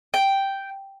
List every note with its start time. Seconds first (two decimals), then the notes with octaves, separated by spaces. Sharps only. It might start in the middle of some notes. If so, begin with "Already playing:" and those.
0.14 G5